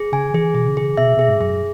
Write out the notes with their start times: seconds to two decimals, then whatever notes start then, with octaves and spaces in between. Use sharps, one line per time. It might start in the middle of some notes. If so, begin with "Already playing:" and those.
Already playing: G#4
0.12 C#3 G#5
0.34 E3 G#4
0.54 B2 G#4
0.66 C#3
0.77 G#4
0.97 B2 E5
1.17 B2 G#4
1.28 G#2
1.40 F#2 G#4